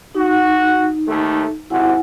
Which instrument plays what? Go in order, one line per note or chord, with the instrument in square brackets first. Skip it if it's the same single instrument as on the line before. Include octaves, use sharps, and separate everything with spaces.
[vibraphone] D#4 [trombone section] F#4
[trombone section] D#2 A3
[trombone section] G#1 C3 F#4 [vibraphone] E4 F#5 G#5